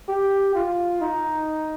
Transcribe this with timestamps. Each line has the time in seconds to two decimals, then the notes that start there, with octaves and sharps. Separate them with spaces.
0.09 G4
0.55 F4
1.01 D#4